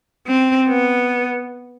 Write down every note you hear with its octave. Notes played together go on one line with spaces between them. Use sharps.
C4
B3